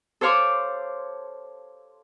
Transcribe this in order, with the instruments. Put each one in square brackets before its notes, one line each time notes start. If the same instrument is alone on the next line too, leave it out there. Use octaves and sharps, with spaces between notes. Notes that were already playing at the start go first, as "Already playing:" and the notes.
[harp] A4 C5 C#5 F5 C6 D6